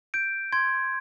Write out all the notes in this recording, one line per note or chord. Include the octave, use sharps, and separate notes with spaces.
G6 D7
C6 G#6